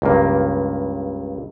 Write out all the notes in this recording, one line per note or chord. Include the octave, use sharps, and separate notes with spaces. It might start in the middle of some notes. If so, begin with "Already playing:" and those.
C#2 G2 A#3